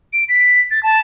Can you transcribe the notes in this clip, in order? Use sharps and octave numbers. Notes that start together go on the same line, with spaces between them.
D7
B6
A6
A5